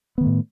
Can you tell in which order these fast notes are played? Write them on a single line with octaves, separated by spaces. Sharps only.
B3 D#3 A3 A2